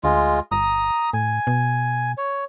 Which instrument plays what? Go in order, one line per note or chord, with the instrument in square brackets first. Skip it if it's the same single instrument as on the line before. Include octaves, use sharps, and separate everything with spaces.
[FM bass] D2 [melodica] G#3 F4
[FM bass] G1 [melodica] A#5 D#6
[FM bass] A2 [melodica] G#5
[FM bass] B2
[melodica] C#5